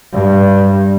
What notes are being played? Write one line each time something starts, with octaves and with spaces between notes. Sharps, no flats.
G2